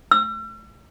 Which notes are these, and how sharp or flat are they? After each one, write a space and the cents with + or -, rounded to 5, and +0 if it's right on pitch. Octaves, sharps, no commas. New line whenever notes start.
E6 +45